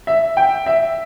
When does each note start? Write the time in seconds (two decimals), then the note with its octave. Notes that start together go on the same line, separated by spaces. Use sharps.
0.07 E5
0.37 G5
0.66 E5